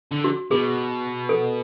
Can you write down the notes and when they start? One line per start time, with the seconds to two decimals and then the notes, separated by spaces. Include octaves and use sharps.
0.11 D3
0.24 F#4
0.51 B2 G#4
1.29 A4